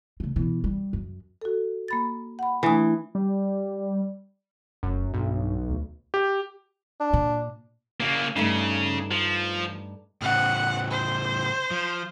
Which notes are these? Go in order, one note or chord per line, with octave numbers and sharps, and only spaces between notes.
C#3 A3
B2 E3
G3
F#2
F#4 A4
A#3 B5 A6
F#5 B5
E3 A3 D4 D#6
G3
F1 F#2
B1 G2
D2
G4
D4
A#2
C#3 A#3
G2 C#3 A3 D#4
F3
A2 C#3 F#5
C5
F3